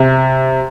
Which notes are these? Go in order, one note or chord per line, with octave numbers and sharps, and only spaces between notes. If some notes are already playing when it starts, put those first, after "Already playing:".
Already playing: C3